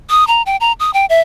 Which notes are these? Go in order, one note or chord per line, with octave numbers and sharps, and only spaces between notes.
D#6
A#5
G5
A#5
D#6
G5
E5